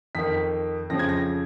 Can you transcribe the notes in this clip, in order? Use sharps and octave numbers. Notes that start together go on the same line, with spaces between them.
F2 D#3 B6
F2 C#3 F3 A#6
G#6
A#6